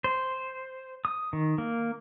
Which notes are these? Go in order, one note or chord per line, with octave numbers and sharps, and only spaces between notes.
C5
D#6
D#3
A#3